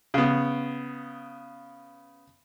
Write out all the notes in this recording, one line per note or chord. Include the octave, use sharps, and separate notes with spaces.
C#3 B3